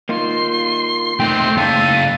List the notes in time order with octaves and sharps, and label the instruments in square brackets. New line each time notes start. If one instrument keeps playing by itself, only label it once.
[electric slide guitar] A#3 D#4 F4 [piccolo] C6
[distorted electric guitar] A3 D#4 [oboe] C4 [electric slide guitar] G5
[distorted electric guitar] F#2 F5 [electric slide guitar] C#3 A#3 [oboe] A4 [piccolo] D#7